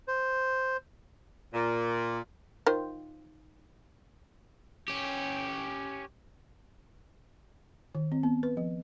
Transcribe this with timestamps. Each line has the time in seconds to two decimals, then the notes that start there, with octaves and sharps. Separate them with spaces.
0.08 C5
1.54 A#2
2.67 D#3 F4 C5
4.88 C#4 G4
7.95 D#3
8.12 C4
8.23 B3
8.43 B4
8.57 F3